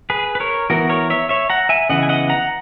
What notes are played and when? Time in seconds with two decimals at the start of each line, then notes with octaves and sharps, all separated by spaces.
0.10 G#4 B4
0.35 B4
0.40 A#4 C#5
0.70 E3 B3 F#4 A#4
0.89 A#4 C#5
1.10 C#5 E5
1.29 C#5 E5
1.50 F#5 A#5
1.69 E5 G#5
1.90 C#3 E3 B3 D#5 F#5
2.03 G#5
2.09 D#5 F#5
2.29 F#5 A#5